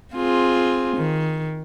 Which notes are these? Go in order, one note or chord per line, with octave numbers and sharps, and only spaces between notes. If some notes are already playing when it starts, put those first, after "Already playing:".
C4 F4 G#4
D#3